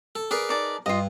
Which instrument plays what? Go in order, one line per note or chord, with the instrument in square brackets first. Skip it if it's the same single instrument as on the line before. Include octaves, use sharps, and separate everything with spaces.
[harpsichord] A4
[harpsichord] G#4 A#4 B4 [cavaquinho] D5
[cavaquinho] D#4 D5 A5
[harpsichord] G2 [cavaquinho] F4 D#5